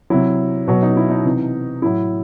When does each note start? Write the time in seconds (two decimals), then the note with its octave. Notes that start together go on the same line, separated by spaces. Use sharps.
0.10 C3 F#3 E4
0.67 B2 F#3 F#4
0.82 D#4
0.97 E4
1.11 D#4
1.25 C3 E3
1.82 A2 F#3 E4